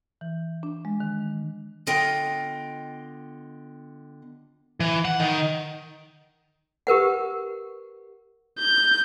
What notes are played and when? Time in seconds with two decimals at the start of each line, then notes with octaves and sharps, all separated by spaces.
0.21 E3
0.63 D4
0.85 G#3
1.00 D#3
1.87 D3 B3 F4 D#5 G5
4.80 E3
5.05 F#5
5.20 D#3
6.87 G4 A#4 B4 F#5
8.59 G6